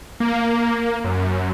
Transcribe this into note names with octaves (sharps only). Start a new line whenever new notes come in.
A#3
F#2